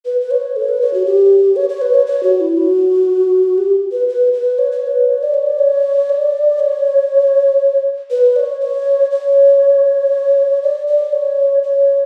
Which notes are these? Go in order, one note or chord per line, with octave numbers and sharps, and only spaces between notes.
B4
B4
C#5
A4
B4
C#5
F#4
G4
C#5
C#5
B4
C#5
C#5
F#4
E4
F#4
G4
B4
B4
B4
C#5
C#5
C#5
B4
C#5
D5
C#5
D5
C#5
D5
C#5
B4
D5
C#5
C#5
C#5
D5
D5
C#5
C#5